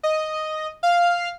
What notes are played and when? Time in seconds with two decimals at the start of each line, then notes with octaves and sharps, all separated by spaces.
0.03 D#5
0.83 F5